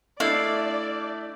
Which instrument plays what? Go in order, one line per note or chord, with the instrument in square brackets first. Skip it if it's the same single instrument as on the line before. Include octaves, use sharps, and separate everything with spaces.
[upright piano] A3 D4 D#5 [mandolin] E4 [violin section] D5 [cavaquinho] F5